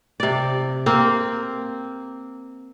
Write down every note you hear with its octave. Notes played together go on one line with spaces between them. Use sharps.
C3 D5
A#3 C4